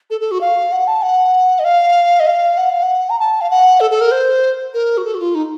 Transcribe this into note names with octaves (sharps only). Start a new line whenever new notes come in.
A4
A4
F#4
F5
F#5
A5
F#5
D#5
F5
D#5
F5
F#5
F5
F#5
A#5
A5
F5
F#5
A4
A4
A#4
C5
A#4
F#4
A4
F#4
F4
D#4